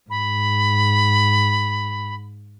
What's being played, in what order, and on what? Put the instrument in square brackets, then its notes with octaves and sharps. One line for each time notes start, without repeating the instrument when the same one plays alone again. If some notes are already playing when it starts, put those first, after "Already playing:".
[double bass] G#2 [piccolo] B5